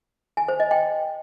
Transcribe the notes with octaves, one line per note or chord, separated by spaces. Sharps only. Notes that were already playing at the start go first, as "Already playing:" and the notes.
G#5
C5
D#5
G5